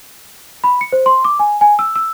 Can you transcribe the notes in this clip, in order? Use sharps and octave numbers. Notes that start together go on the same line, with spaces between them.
B5
C#7
C5
C6
D6
G#5
G#5
E6
E6